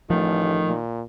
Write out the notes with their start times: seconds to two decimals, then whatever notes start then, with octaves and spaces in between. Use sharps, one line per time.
0.10 A1 D#3 F3 A3
0.67 A#2